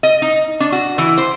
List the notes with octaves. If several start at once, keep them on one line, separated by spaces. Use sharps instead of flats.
D#5
D#4
D4
F#4
E3
C5